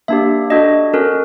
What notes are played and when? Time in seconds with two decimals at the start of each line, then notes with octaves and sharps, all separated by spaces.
0.08 A#3 D4 G4 E5
0.50 D4 F#4 A4 D#5
0.93 C#4 F#4 A4 A#4